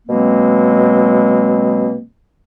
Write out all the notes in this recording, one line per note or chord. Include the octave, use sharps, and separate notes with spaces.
B2 F#3 G#3 A#3 C4